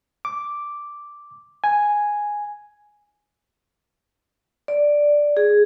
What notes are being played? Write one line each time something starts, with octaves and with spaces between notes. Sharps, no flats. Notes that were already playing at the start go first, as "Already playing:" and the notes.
D6
G#5
D5
G#4